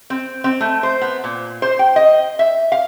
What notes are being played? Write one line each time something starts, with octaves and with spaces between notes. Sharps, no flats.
C4
C4
A3
C5
B3
A#2
C5
G5
D#5
E5
F5